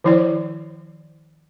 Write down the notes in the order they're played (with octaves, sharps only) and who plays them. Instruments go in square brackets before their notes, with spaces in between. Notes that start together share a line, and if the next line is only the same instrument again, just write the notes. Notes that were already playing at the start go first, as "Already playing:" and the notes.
[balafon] D#3 F3 E4 C5 D5